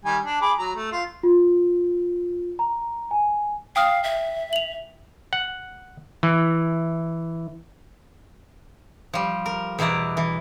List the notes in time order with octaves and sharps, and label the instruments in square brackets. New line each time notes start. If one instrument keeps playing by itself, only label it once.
[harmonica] D#3 G3 G#5
D4
G#4 B5 D6
F#3 A#5
A3
F4
[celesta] F4
A#5
G#5
[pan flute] F5 [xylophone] G5 D#6 F6
[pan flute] E5
[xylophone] F7 F#7
[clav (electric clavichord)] F#5
E3
[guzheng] F3 G3
A#4
E2 B2 E4 D5 A#5
E3